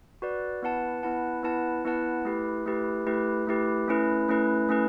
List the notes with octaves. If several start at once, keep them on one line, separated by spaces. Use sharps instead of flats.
F#4 B4 D5
B3 E4 B4 F#5 A5
B3 E4 B4 F#5 A5
B3 E4 B4 F#5 A5
B3 E4 B4 F#5 A5
A3 E4 G4 B4
A3 E4 G4 B4
A3 E4 G4 B4
A3 E4 G4 B4
A3 C#4 E4 B4
A3 C#4 E4 B4
A3 C#4 E4 B4